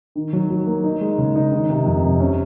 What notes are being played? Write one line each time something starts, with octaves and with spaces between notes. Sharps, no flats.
D#3
F#3
F#3
A#3
D#4
G#3
C#3
D#4
D#3
C3
F2
C3
C#4